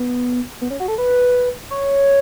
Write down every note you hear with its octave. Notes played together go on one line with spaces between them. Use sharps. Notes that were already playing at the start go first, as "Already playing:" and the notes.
Already playing: B3
B3
C#4
F#4
A4
B4
C#5